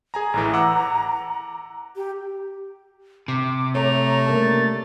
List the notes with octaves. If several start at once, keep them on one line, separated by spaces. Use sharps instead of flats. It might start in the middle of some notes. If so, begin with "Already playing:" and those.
G#4 G#5 A#5
A1 A2 E3 A#5
F#5 D6 E6
G4
C3 D6
A3 C#5 A#5
C#3 G3 A#3 A5
A6